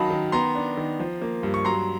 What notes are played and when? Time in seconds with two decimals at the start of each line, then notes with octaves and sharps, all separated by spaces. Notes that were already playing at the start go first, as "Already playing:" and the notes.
Already playing: D#3 F#3 D#5 F5 A5 B5
0.10 D#3
0.32 B3 A#5 C6
0.55 D4
0.77 D#3
1.00 F3
1.22 A#3
1.43 G2
1.54 C#6
1.65 F#3 A#5 C6